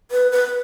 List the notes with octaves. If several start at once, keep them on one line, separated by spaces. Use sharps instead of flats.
B4
B4